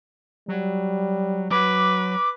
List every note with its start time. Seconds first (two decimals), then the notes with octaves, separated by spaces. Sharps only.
0.48 F#3 G3
1.51 F#3 B4 D6